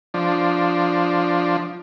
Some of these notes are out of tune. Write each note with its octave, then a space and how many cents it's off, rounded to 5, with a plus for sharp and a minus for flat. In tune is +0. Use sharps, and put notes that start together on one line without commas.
F3 +0 D4 +0